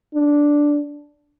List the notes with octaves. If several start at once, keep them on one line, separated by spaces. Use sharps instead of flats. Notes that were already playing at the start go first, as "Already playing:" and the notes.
D4